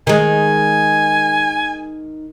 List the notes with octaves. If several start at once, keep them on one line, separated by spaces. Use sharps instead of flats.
D#3 G#3 G#5